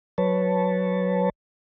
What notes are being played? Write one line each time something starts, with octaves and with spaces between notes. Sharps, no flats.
F#3 B4 C#5 A5